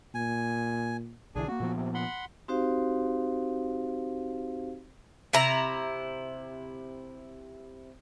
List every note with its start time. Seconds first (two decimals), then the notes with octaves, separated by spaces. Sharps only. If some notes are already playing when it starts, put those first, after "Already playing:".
0.14 A#2 G#5
1.35 B1 D3 E3 D4 G#4 G#5
1.48 A#3 C4 F#4
1.60 A#2 F3 B3
1.76 C3
1.95 F#5 B5 C6
2.48 C4 D#4 F#4 G4 C5 F5
5.33 C3 E4 A#5